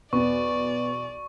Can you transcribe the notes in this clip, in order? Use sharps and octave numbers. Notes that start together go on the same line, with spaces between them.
B1 E2 B3 D5 C#6